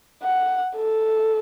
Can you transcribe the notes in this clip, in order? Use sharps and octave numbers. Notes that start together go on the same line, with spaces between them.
F#5
A4